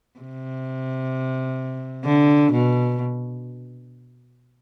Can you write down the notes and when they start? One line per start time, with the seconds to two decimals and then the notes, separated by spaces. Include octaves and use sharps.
0.19 C3
2.05 D3
2.52 B2